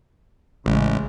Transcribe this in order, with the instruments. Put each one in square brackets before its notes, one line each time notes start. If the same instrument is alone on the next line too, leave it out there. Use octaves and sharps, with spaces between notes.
[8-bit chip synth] A1 [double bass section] C#3 G#3